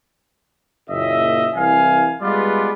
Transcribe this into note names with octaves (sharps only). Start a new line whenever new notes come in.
F#1 A#2 D#5 E5
C2 E3 F5 G#5
G3 G#3 B3 F4 B4 D5